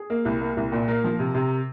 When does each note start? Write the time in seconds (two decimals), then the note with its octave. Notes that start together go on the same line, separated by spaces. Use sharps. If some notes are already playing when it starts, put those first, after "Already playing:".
Already playing: G#4
0.10 A#3
0.25 C2
0.41 A#3
0.57 C2
0.72 A#2
0.88 A#3 A#4
1.04 F3
1.19 C3
1.34 C3